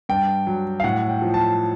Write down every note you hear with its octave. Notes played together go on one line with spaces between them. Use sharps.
G2 G5
F#3
F5
A2 F#5
G5
F3
A5